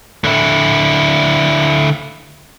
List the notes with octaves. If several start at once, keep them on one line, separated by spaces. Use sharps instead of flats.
D3 E4